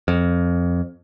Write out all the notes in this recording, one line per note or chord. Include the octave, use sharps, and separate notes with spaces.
F2